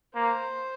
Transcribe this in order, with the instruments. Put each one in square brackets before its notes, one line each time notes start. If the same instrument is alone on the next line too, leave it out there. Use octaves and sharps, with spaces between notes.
[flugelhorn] A#3 [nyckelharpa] C5